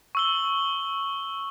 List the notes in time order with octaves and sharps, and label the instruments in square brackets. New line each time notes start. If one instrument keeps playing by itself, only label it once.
[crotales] C#6 E6 G7